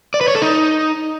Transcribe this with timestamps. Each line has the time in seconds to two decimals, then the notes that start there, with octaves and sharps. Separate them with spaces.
0.14 D5
0.21 B4
0.28 C#5
0.35 A4
0.42 D#4